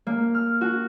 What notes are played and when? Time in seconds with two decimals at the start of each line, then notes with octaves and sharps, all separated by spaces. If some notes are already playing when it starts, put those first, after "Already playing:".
0.07 A#3
0.34 F6
0.61 F#4